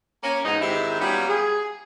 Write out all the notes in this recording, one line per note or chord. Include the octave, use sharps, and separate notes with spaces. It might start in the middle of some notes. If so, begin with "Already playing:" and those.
A#3 C#4
E2 G#2 B2 D#4
G#2 D#3 C4 E4 G4
F#3 G3 A#3 B3 C#4 F4
G#4